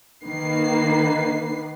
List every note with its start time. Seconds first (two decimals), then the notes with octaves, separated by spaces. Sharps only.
0.23 D#3 A#3 B4 C7